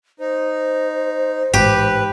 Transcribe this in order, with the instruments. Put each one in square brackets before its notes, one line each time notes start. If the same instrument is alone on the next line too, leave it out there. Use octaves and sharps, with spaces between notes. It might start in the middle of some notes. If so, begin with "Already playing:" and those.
[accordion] D#4 [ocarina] C5
[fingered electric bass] A1 G#2 [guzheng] G4 [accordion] B4